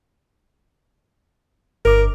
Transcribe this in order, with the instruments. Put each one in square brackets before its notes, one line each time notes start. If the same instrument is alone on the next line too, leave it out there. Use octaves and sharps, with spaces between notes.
[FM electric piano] G1 D6 [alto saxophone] A#4